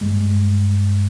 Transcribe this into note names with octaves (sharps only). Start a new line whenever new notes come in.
G2 G3 G#3